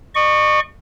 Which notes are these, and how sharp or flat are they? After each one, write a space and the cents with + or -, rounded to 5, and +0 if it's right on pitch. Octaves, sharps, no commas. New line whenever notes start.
D#5 -45 C#6 +0